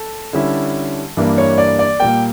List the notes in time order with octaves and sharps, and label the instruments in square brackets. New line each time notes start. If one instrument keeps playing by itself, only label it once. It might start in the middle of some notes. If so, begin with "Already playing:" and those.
Already playing: [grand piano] A4
D3 G3 C#4 E4
G2 E3 A#3 D4
C#5
D5
D5
A#2 G3 A#3 G5